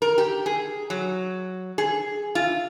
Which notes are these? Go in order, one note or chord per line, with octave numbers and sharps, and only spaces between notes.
A#4
G4
G#4
F#3
G#4
F4